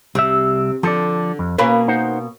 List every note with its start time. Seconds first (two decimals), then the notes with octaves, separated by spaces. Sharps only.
0.15 C2 C3 E5
0.83 D3 F3 A4 D5
1.39 F2
1.58 B2 A#3 C#4 B4 B5
1.88 D#4 C5 F#5